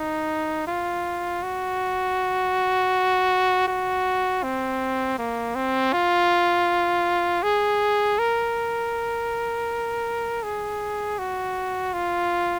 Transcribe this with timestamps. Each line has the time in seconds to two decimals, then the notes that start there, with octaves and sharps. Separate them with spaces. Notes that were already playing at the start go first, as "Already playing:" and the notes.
Already playing: D#4
0.67 F4
1.43 F#4
3.67 F#4
4.43 C4
5.18 A#3
5.55 C4
5.92 F4
7.43 G#4
8.18 A#4
10.43 G#4
11.18 F#4
11.93 F4